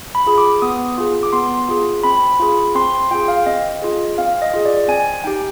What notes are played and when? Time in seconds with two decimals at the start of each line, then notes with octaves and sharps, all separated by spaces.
0.15 B5
0.26 F4 G#4
0.38 D6
0.62 B3 D#6
0.98 F4 G#4
1.23 D6
1.33 B3 C6
1.69 F4 G#4
2.03 C4 B5
2.39 F4 G#4
2.75 C4 C6
2.93 C6
3.11 F4 G#4 G5
3.28 F5
3.46 C4 D#5
3.82 F4 G#4
4.18 C4 F5
4.42 D#5
4.53 F4 G#4
4.66 D5
4.88 C4 G#5
5.24 D#4 G4 G5